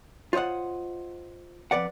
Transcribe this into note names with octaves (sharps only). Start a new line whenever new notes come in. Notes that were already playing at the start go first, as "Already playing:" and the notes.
F4 C5 C#5 D#5 F#5
F2 C#3 B4 D5 F#5